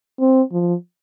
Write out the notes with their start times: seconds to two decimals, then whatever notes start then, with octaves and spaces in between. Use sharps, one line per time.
0.20 C4
0.52 F3